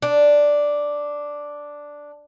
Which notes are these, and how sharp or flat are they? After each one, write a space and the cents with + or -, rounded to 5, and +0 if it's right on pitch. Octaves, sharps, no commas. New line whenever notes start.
D4 +0 D5 +0